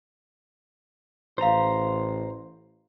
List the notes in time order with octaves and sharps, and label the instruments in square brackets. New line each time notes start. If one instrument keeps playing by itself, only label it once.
[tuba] A1 [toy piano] E4 F5 [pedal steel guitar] C5 A#5